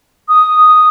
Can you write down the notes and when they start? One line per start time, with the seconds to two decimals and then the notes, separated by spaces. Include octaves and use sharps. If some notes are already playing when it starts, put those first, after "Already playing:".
0.29 D#6